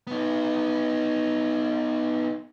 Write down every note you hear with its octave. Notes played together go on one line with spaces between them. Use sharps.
B3 D#4